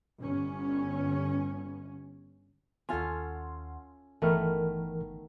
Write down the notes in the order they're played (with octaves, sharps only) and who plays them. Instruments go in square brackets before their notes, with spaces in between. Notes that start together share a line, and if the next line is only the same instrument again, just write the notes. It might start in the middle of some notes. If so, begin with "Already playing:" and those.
[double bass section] G1 C#4
[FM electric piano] D#2 F#5 C6 [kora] C#4 F4 A4
[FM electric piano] G1 [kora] D#3 A3 B3 [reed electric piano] E3 A#4 F6